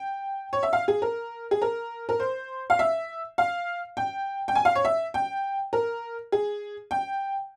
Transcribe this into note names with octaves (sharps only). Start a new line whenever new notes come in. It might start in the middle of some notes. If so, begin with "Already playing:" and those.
Already playing: G5
C#5
E5
F5
G#4
A#4
G#4
A#4
A#4
C5
F5
E5
F5
G5
G5
G#5
F5
C#5
E5
G5
A#4
G#4
G5